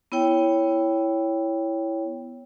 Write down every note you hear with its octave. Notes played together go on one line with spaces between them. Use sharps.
B3 E4 C#5 G5